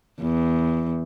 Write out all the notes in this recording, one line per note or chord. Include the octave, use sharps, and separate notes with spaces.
E2